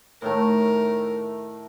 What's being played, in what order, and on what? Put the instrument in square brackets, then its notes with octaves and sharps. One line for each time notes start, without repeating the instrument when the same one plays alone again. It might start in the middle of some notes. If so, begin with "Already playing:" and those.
[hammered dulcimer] A2 D#3 A3 [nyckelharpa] A#4